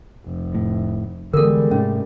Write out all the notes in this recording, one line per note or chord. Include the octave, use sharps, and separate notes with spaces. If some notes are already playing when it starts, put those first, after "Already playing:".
F1
A2
D3 E3 G3 G#3 B3 A4 A#4
G#2 C3 A3 C#4